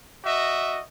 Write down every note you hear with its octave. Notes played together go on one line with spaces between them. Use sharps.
F#4 D#5 E5